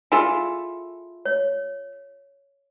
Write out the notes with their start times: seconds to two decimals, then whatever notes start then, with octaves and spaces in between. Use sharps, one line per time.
0.12 E4 F4 G#4 A4 G#5
1.25 C#5